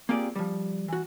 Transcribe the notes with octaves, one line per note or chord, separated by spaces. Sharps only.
A#3 C4 F4 G4 G#4 D5
F3 G3
E3 F#4